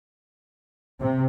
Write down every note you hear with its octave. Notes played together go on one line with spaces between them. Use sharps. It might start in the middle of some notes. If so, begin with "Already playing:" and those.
C3